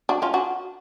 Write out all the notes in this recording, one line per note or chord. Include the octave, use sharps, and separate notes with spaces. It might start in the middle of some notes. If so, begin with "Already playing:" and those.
D4 F#4
C#4 F4
D4 F#4